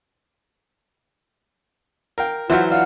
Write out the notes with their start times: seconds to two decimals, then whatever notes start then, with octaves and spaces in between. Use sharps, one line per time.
2.18 A#4 F5 G5
2.50 E3 F#3 F4 C5 E5 F#5 F6 G6
2.70 D4 F4 F5 F#5 F6